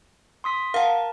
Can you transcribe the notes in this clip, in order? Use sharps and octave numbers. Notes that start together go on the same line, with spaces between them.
C6 D#6 B6
A#4 F5 F#5 A5